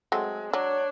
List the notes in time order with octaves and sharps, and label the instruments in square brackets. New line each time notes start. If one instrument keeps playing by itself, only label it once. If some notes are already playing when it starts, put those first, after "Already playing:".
[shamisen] F#3 A3 C4 [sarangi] G#3
[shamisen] F#3 [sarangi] D4 [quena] C#5